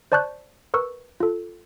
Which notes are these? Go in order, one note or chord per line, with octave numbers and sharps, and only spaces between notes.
C5 D5 A5 C#6 F#6 G6
A#4 B4 C#6 E6
F4 A4